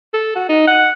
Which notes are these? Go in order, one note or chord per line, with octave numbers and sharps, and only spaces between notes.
A4
F#4
D#4
F#5